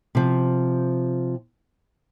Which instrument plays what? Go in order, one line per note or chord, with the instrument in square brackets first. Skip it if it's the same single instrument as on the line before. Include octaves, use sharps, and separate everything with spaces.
[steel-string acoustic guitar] C3 F3